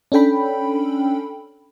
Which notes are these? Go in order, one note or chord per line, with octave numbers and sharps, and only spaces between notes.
C#4 D4 A4 G5 B5